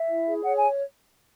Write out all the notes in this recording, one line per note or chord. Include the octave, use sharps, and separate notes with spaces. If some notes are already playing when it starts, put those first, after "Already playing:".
Already playing: E5
E4
G#4
C#5 F#5
G#5